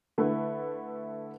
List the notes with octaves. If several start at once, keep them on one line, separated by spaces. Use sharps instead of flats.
D3 A3 E4 B4